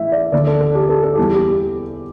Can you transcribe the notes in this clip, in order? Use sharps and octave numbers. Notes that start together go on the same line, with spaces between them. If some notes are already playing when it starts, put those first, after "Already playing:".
Already playing: A2 E3 A3 E5
D5
D2 D3 A3 D5
A4
A4
G4
A4
A4
E2 E3 G3 G4
G4